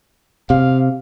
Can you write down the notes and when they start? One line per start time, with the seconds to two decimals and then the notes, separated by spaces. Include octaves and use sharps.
0.50 C3 F5